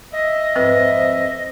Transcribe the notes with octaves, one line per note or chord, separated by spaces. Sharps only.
D#5 E5
F2 G#2 C4 B4